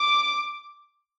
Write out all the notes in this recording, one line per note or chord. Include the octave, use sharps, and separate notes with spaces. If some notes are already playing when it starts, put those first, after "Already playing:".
Already playing: D6